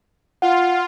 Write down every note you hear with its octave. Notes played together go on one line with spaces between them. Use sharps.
F4 F#5